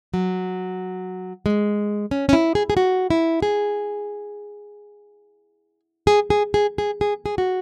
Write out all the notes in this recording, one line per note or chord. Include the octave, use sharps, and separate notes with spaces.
F#3
G#3
C#4
C#4
E4
G#4
G#4
F#4
E4
G#4
G#4
G#4
G#4
G#4
G#4
G#4
F#4